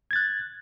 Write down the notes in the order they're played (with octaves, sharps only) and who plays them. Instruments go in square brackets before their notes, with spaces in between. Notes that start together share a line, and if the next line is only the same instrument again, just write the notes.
[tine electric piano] G#6
A6
F#6